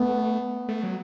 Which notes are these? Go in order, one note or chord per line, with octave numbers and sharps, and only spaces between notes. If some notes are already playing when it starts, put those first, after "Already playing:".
Already playing: A3 B3
A3
F#3